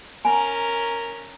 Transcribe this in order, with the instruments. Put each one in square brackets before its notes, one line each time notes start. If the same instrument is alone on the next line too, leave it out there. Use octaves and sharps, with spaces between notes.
[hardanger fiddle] C#4 A#4 [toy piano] G#5 A#5